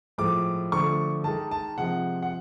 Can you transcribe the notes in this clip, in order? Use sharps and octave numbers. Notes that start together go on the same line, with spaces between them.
A2 F3 G#3 D6
D3 F3 A3 C#6
D#3 G#3 A5
A5
C3 F3 G#3 F#5
F#5